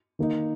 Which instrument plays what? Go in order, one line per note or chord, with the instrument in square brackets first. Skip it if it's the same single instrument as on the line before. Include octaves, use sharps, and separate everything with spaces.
[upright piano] D#3 A#3 D#4